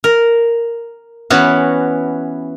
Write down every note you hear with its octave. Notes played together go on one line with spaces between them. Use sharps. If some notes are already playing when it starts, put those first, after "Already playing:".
A#4
E3 B3 C#4 F#4